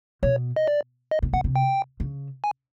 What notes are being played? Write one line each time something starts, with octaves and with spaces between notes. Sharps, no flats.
B2 C#5
D#5
D5
D#5
B2
B2 F#5
C3
G5
C#3
G#5